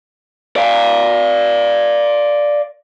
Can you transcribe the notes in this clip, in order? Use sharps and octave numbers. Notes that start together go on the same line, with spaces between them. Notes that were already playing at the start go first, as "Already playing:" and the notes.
D5 F5